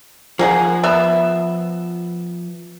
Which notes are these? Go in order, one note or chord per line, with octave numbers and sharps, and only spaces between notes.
F3 A#3 G#4 F#5
B3 E5